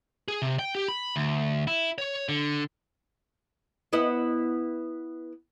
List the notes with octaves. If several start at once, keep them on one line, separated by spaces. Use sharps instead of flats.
G#4
C3
G5
G4
B5
D2
E4
C#5
D3
B3 E4 D#5